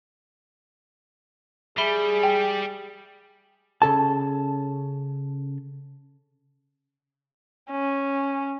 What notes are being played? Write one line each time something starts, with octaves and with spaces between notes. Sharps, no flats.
G3 G#4 E5 B5 G7
G5
C#3 A4 A5
C#4